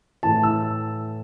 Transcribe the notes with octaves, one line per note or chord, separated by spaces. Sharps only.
A2 E3 A5
E6